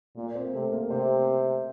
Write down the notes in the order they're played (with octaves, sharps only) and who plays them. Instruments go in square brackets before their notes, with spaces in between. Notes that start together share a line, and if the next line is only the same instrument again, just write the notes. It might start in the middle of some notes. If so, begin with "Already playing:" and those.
[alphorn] A#2 [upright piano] A#3 A#4
[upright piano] C4 C5
[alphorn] C3 [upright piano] A3 A4
[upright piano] A#3 A#4
[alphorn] C3 [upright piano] C4 C5